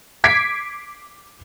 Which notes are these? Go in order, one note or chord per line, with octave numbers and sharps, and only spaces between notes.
D6 G#6 B6 C7 D7